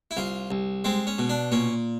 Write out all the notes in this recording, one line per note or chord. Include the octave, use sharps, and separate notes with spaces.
E4
C2 F4
C2
G#3 C4
C#4
B2
D4
A#2 C#4